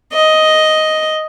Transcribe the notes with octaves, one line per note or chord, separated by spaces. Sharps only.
D#5